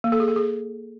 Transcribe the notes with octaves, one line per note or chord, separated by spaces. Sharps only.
A#3
A4
G#4
A4
G#4